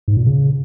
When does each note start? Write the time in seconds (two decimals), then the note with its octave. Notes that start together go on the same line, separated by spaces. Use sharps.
0.08 G#2
0.17 A#2
0.26 C#3